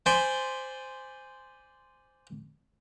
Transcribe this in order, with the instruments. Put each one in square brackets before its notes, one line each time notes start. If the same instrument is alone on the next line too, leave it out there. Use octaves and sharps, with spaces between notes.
[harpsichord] C5 D5 G#5 B5 C6